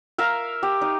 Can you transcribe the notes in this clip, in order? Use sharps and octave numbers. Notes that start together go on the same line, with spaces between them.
A#4 E5 F5 A#5
G4
D#4